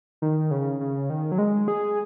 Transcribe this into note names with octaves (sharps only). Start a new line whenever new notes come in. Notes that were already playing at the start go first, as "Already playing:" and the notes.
D#3
C#3
C#3
D#3
F#3
G#3
G#4